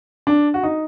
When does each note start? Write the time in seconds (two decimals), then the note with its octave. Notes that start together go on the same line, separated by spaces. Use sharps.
0.27 D4
0.54 F#4
0.63 D#4